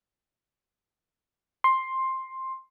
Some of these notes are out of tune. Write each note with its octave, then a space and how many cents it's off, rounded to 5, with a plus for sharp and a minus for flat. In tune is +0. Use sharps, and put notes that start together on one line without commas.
C6 +10